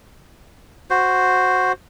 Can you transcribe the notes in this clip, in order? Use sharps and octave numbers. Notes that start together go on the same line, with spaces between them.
F#4 C5